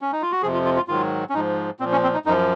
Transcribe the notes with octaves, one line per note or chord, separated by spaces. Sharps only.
C#4
D#4
F4
F#4
F2 C3 F3 G#4
F4
F4
F4
G#2 D#3 F#3 F4
C#4
G#2 F3 D#4
A#2 F3 C4
C#4
C4
D#4
F#2 F3 D#4